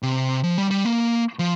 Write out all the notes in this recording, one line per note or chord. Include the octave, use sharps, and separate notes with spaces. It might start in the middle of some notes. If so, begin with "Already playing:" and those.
C3
F3
G3
G3
A#3
F3